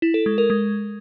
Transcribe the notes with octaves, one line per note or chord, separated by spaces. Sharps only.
E4
A4
G#3
A#4
G#3